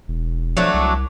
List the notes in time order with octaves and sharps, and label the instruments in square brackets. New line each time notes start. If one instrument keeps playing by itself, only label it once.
[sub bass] E1
[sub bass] F3 [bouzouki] F#3 A3 D4
[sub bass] C2